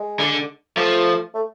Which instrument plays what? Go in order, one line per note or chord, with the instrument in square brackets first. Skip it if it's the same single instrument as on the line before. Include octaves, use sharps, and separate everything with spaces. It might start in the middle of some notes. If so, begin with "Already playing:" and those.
Already playing: [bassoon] G#3
[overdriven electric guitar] D3
[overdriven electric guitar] F3 [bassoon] A3
[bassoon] A3